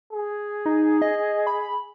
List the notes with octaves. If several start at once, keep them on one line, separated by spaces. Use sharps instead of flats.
G#4
D#4
D#5
B5